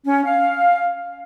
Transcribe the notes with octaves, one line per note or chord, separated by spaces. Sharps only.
C#4
F5